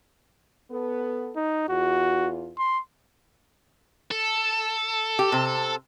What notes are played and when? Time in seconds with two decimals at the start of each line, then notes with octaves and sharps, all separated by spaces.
0.71 B3 A4
1.36 D#4
1.68 E2 F4 F#4
2.58 C6
4.11 A4
5.19 G4
5.32 C3 C5